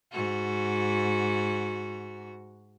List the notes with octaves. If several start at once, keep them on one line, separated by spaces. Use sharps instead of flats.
G#2 F#4